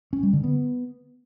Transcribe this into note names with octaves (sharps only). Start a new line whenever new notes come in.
C#4
G3
D3
B3